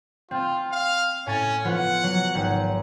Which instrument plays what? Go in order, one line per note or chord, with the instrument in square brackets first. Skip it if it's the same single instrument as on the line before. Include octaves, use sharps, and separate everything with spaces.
[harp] C4 [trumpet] F4
[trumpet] F5
[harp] A2 G#5 A6 [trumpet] C#4
[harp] F3 B3 F4 [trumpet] F#5
[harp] F#3
G#1